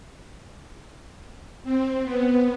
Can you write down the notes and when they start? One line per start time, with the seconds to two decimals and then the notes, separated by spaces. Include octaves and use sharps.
1.64 C4
2.04 B3